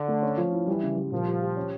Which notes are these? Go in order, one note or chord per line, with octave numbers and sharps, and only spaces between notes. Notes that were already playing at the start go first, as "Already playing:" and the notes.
Already playing: D3
A3
C#4
F3
E4
E3 G3
C#3
G3
A#2 F3
G4
G4
C#4